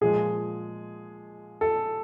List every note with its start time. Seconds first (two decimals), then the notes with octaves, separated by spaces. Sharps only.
0.01 A#2 F3 G#3 G#4
1.61 A4